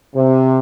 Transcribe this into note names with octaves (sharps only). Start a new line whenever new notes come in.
C3